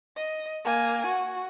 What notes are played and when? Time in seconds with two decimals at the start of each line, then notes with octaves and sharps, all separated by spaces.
0.17 D#5
0.65 A#3 G#5
1.07 F#4